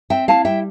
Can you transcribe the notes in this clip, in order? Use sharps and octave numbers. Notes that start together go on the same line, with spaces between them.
C4 E5 G5
E4 F5 A5
G3 E5 G5